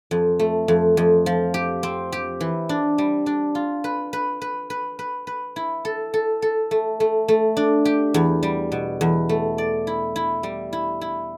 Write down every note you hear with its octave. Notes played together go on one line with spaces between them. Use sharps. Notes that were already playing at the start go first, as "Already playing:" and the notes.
F2
A3
F2
F2
F3
G4
C4
G4
E3
D4
G3
D4
F4
B4
B4
B4
B4
B4
B4
E4
A4
A4
A4
A3
A3
A3
D4
G4
E2
G3
B2
E2
A3
D5
E4
E4
G3
E4
E4